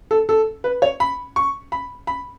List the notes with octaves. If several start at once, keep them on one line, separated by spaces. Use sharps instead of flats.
A4
A4
B4
C#5
B5
C#6
B5
B5